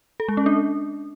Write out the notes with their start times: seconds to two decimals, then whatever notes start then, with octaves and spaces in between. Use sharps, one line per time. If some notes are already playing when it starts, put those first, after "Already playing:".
0.20 A4
0.28 G#3
0.37 C#4
0.46 D4